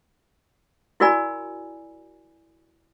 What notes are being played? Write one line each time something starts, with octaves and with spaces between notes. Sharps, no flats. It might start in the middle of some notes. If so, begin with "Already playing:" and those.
E4 F#4 A#4 D5 G#5 B5